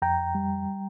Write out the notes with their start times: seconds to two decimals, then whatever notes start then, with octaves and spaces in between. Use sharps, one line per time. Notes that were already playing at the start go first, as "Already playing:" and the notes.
0.02 F2 G5 A#5
0.35 G3